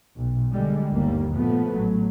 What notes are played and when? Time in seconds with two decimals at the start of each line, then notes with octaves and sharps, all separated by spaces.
0.15 B1
0.52 D3 G3 G#3
0.91 G1 D#2 G3 A#3
1.33 A#2 F3 A3 B3
1.71 A1 F#3